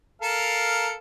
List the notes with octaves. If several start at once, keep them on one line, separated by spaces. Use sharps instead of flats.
A4 A#4 F5